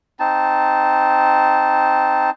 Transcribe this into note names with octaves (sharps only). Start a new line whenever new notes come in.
C4 D#4 A5